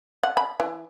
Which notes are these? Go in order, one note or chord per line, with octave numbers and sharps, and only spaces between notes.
F#5
B5
E3